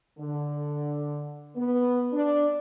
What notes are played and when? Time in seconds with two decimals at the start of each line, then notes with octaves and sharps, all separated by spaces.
0.19 D3
1.56 B3
2.13 D4